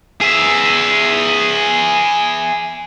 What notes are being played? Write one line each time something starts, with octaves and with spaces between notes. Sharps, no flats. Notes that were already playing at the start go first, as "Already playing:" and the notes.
G#4 E5